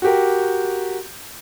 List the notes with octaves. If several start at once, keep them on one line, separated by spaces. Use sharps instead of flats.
F#4 G4 A#4